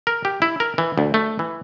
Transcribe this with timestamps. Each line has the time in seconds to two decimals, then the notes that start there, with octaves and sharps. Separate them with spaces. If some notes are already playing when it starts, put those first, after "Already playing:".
0.07 A#4
0.25 G4
0.42 E4
0.60 A#4
0.78 E3
0.98 D2
1.14 A3
1.39 E3